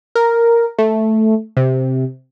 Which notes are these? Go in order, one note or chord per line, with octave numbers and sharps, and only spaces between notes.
A#4
A3
C3